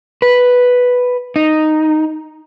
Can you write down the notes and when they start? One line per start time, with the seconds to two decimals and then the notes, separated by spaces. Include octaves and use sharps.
0.22 B4
1.36 D#4